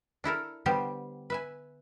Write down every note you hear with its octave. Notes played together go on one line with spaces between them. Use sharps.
D4 E4 A4 A#4
D3 G3 B3 G4 C5
B4 E5 G#5